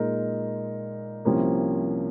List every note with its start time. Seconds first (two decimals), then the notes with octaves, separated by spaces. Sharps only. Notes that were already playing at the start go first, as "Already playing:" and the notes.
Already playing: A#2 G#3 D#4 A#4
1.25 C2 C3 F3 A#3 C#4